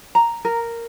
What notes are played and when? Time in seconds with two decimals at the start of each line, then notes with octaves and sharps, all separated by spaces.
0.15 A#5
0.45 A#4